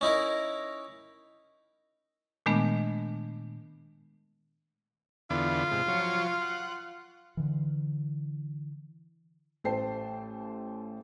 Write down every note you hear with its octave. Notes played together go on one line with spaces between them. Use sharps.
C#4 D#4 E4 A#4
A#2 D#3 G#3 A3 B3 D4
E2 D3 B3 F4
G#2 C3
F3 F#3 C#5
F#5
D3 E3
A1 A3 C5 G5 A5 C7